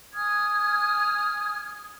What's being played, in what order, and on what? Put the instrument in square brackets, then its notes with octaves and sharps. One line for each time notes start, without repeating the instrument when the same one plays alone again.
[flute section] G#5 D#6 F6 G#6